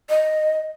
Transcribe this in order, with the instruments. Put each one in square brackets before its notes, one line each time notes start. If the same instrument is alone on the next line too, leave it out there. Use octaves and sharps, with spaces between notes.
[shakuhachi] D#5